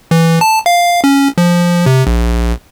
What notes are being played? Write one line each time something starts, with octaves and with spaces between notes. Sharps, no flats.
E3
A5
F5
C#4
F3
C3
A#1